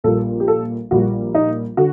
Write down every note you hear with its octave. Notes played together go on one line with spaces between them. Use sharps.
A#1 A#2 G3 A#3 A4
G4
A4
A#1 A#2 G3 A#3 F#4
D#4
D3 F#4